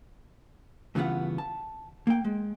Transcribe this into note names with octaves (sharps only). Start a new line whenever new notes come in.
G2 C#3 E3 B3 F4 F#5
A5
A#3 G5
G#3